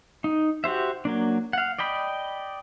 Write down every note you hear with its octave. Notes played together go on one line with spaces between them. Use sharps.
D#4
F#4 G4 C5 E5
F#3 A#3 D4
F5 F#5
D5 D#5 G5 B5